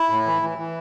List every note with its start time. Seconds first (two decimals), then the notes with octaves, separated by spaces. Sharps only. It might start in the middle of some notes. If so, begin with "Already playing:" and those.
Already playing: E4
0.10 A2
0.26 E3
0.42 E3
0.58 E3